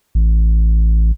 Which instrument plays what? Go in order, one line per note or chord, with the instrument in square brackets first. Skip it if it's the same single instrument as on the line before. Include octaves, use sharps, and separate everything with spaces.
[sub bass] A1